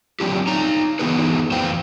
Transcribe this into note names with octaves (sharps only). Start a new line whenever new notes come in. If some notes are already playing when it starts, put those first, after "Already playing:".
F#3 C4 D4 F4 G4
D#4 C#5 A#5
E3 B3 D#4 F#4 G#4 B4
F2 A2 C5 F5 G5